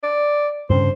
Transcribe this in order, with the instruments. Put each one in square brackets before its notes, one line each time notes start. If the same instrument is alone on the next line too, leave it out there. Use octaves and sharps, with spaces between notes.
[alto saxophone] D5
[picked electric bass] G2 C#3 [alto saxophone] C5